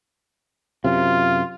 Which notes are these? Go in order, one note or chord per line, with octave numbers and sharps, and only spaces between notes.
F#2 C3 F4